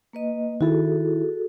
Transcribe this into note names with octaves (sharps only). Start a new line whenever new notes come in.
A#3 B4 D#5
D#3 E4 F#4 G#4 A4